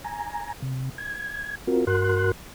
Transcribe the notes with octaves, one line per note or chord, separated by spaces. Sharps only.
G#5 A#5
C3
G#6
C4 F4 F#4 A#4
G2 F#4 A#4 C6 F#6